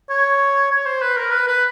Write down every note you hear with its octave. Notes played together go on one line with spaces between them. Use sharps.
C#5
C#5
C5
B4
A#4
B4
B4